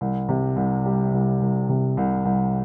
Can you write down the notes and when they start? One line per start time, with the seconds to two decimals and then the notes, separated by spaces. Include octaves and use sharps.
0.01 C2
0.29 C3
0.56 C2
0.86 G3
1.13 C2
1.42 C2
1.69 C3
1.97 C2
2.25 C2